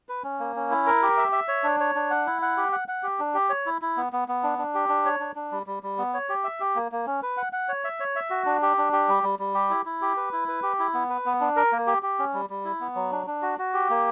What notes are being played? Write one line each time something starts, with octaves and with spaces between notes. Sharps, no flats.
B4
C#4
A#3
C#4
E4
A#4
G4
E5
E5
C#5
D4
C#5
D4
F#5
E4
F#5
G4
F#5
F#5
G4
D4
G4
C#5
E4
E4
B3
B3
B3
D4
D4
G4
D4
C#5
D4
D4
G3
G3
G3
B3
C#5
G4
E5
G4
A#3
A#3
C#4
B4
F#5
F#5
C#5
E5
C#5
E5
F#4
D4
G4
D4
G4
G3
G3
G3
G4
E4
E4
G4
B4
E4
B4
G4
E4
B3
B4
B3
D4
A#4
A#3
G4
G4
C#4
G3
G3
E4
B3
F#3
D4
D4
F#4
F#4
G4
A#3